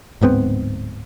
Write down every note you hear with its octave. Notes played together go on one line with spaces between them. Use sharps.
D1 G#2 B3 C4